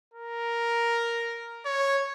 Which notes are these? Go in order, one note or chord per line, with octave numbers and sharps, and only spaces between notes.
A#4
C#5